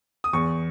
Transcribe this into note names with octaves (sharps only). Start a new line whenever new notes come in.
D#6
E2 C#6